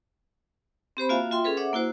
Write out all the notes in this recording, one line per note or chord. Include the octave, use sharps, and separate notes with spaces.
C4 G4 C5 B5
A#3 F4 F#4 E5 F5 G#5
F4 E5 G5 C6
C#4 G#4 A4 B4
C#5 E5 F#5 D6
A#3 E4 F#4 C5